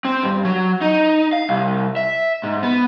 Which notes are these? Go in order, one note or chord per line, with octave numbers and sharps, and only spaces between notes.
C4
G2
F#3
D#4
F5
C2
E5
G#2
B3